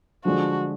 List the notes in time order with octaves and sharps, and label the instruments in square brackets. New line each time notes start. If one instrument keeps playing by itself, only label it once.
[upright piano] D3 F3 G#3 D4 [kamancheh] F#4